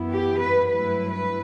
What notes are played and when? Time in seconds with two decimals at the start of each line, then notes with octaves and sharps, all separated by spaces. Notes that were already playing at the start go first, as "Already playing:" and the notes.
Already playing: F#2 E3 B3 E4
0.13 G4
0.41 B4
0.69 G2 F#3 A3 E4 B4
1.12 B4